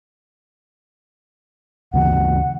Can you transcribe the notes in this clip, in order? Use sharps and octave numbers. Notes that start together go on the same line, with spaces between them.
D2 C#3 E3 F#5